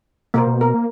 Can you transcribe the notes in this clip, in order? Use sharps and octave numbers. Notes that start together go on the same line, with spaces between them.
B2 A#3 A#4 C5
B2
A#4
A#3